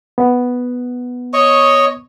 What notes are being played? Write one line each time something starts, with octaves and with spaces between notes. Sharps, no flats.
B3
C#5 D#5 C#6